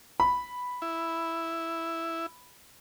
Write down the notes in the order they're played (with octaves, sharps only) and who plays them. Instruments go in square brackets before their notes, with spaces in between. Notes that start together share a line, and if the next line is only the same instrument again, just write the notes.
[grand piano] B5
[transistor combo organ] E4